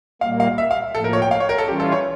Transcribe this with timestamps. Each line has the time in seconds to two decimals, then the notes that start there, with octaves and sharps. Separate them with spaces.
0.21 A#2 G3 A#3 F5
0.40 F5
0.58 E5
0.71 F5
0.95 A2 F3 A#3 A4
1.04 A#4
1.13 C#5
1.22 G5
1.31 F5
1.40 C#5
1.49 A#4
1.58 A4
1.68 E3 G3 C#4 F4 G4
1.80 A4
1.92 C#5